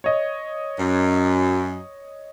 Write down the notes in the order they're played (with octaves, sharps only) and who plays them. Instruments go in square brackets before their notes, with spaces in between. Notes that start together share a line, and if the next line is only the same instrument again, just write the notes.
[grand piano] C#5 D#5
[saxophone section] F#2